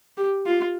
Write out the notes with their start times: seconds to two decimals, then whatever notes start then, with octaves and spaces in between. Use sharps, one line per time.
0.17 G4
0.46 F4